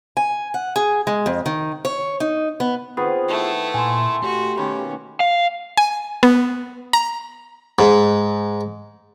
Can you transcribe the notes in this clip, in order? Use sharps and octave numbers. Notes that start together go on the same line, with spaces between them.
G#5
F#5
G#4
G#3
F2
D#3
C#5
D#4
B3
D#3 B3 C4 F4 G#4
A3 E4
A#2 G#5 C6
A3 F#4 G4
B2 D#3 A#3 C#4 B5 D6
F5
G#5
B3
A#5
G#2